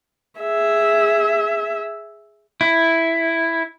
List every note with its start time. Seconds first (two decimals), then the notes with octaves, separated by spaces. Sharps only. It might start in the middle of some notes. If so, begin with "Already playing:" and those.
0.40 G#4 E5
2.61 E4